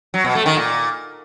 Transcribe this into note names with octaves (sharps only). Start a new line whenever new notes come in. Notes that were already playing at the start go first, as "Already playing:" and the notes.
F#3
B2
A3
D#3
A#2